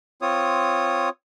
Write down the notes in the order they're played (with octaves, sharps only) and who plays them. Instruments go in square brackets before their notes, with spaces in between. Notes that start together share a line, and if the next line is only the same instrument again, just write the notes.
[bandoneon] C4 F4 C#5 D#6